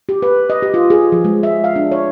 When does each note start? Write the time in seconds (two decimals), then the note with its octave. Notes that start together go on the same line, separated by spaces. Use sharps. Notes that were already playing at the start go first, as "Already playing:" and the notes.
0.09 G4
0.22 B4
0.50 D#5
0.62 G4
0.74 F4
0.90 G#4
1.12 F3
1.24 G#3
1.43 E5
1.64 F5
1.76 D4
1.92 C#5